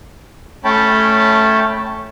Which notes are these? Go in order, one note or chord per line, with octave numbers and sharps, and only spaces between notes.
A3 C#4 C#5 G5 A5 B5